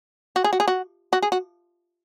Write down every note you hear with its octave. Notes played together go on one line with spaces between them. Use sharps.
F#4
G#4
F#4
G#4
F#4
F#4
G#4
F#4